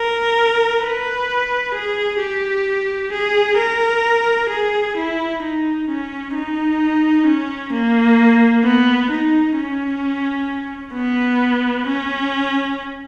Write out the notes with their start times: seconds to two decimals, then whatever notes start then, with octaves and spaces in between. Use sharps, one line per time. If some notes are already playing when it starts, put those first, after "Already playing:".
Already playing: A#4
0.82 B4
1.74 G#4
2.20 G4
3.12 G#4
3.58 A#4
4.50 G#4
4.97 E4
5.43 D#4
5.89 C#4
6.35 D#4
7.27 C#4
7.73 A#3
8.64 B3
9.10 D#4
9.57 C#4
10.94 B3
11.87 C#4